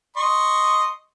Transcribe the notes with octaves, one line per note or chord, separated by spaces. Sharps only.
D#5 C6 C#6